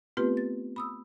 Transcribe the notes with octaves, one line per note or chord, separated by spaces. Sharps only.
A3 B3 C4 F4 G4 B4
A6
B5 D#6 E6